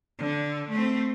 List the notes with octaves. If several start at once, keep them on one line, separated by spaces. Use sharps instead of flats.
D3
A3 C4